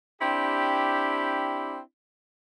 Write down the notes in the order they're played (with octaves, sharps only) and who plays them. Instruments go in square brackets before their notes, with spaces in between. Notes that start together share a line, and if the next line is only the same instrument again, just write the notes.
[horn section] C4 D4 E4 G4